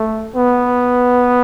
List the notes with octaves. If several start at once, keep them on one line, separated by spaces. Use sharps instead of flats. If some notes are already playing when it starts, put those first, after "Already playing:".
Already playing: A3
B3